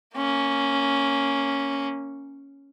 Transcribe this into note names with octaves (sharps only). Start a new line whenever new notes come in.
A#3 C#4